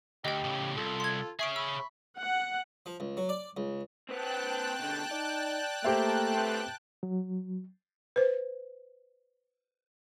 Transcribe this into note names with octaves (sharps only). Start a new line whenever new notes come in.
D2 G4 D#5 G5
A2 C#3
C2 F4 A4
C6 G#6
C#4 G#4 E5 C#6 D7
B5 C#6 E6
F#5
F3
C#2
F#3
D5
C#2
C4 B4 G5 A5 F#6
B2 D3
D#4 D5
A3 A#3 G4 C5 E5
C4 B4
F#3
B4 C5